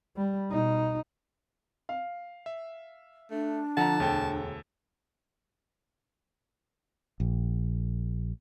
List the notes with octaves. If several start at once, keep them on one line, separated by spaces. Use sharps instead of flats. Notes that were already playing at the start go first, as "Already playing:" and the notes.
G3
B2 D#4
F5
E5
A3 D4
D3 F3 F#5 A5 A#5
E1 D2 A4 G5
A#1